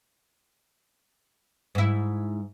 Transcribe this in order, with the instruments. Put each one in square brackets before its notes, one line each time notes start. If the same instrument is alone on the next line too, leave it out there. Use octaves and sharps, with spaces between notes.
[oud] G#2 E4